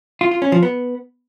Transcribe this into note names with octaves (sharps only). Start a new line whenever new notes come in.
F4
F4
C#4
F3
B3